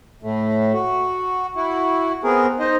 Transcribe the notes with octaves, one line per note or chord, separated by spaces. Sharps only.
A2 A3
F#4
E4 F#4
B3 C4 G#4 A#4
D#4 C5 D#5